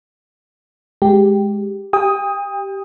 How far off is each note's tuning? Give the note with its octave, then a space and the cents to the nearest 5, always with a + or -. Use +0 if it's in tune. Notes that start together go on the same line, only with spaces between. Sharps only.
G#3 +0 G4 +0
G4 -10 G5 +40 D#6 +5